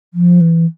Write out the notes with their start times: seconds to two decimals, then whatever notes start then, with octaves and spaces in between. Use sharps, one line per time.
0.14 F3
0.41 E3